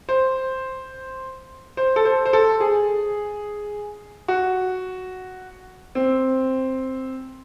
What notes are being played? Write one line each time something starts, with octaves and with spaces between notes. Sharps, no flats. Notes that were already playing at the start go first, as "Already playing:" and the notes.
C5
C5
A4
C5
C5
A4
G#4
F#4
C4